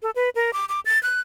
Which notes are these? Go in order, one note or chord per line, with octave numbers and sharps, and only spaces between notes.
A4
B4
A#4
D6
D6
A6
F#6